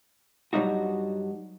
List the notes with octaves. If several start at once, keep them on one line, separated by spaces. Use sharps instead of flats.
G2 F#3 G3 D4 D#4 F#4